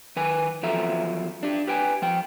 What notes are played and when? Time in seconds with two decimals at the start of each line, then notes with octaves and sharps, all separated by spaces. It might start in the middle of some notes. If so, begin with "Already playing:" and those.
0.16 D#3 B4 G#5
0.63 E2 F3 F#3 A4 E5 A#5
1.43 D4 G4
1.67 G4 B4 G5 G#5
2.02 F3 G5